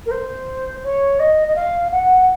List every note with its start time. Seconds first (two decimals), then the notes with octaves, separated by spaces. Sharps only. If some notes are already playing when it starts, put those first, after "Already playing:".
0.06 A#4
0.11 C5
0.84 C#5
1.20 D#5
1.48 D#5
1.55 F5
1.92 F#5